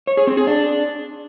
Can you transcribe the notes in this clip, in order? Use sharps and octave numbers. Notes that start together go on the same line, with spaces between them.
C#5
G#4
C4
G#4
D4